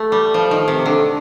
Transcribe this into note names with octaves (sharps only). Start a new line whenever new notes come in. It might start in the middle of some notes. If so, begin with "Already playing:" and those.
Already playing: A3
G3
F3
D#3
C3
D3